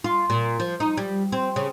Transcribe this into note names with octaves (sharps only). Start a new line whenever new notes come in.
F4
A#2
F3
D#4
G3
C4
C#3